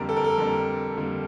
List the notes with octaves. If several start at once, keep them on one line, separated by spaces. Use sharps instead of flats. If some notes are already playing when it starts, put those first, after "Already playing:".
Already playing: F2 D3 G3 A#3 A#4
A4
A#4
A4
F2 D3 G3 A#3 A#4
F2 D3 G3 A#3